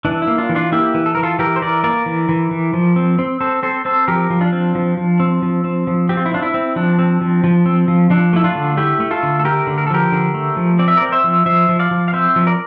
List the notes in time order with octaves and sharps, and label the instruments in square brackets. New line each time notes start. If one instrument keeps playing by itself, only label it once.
[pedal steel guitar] E3 D4
E4
A#3
D4 F4
E3
D4 F4
A#3 E4 G4
E3
A4
E3 A#4
F4 A4
E3 G4 A#4
C5
E3 A#4 D5
A#3 A#4 D5
E3
E3
E3
F3
C4
C4
C4 A4 C5
C4 A4 C5
C4 A4 C5
F3 G4 A#4
F3
D4 F4
C4
F3
F3
C4
F3
C4
F3
C4 G4
F4
E4
C4 D4 F4
E4
C4
F3 D4
C4
F3
F3
C4
F3
F3 D4
A3 E4
D4 F4
D3
A3 E4 G4
A3
F4 A4
D3
A4
A3 G4 A#4
D3
A#4
A4
F3 G4 A#4
D3
A3
F3
C4 D5
E5
C4 A#4 D5
C5 E5
F3
F3 C5 E5
F3
D5 F5
F3
F5
C4 C5 E5
F3
A#4 D5